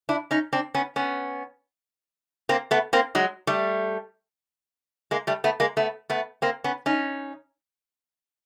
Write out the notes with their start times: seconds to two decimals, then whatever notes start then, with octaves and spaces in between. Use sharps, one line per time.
0.09 D4 E4
0.31 C#4 D#4
0.53 C4 D4
0.74 B3 C#4
0.96 B3 C#4
2.49 A#3 C4
2.71 A3 B3
2.93 A#3 C4
3.15 F#3 G#3
3.47 G3 A3
5.11 G#3 A#3
5.27 G3 A3
5.44 A3 B3
5.60 G#3 A#3
5.77 A3 B3
6.10 A3 B3
6.42 A#3 C4
6.64 B3 C#4
6.86 C#4 D#4